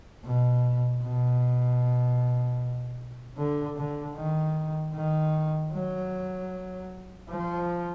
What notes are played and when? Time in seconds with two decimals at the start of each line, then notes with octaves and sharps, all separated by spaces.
0.25 B2
1.03 B2
3.37 D3
3.77 D3
4.16 D#3
4.94 D#3
5.73 F#3
7.29 F3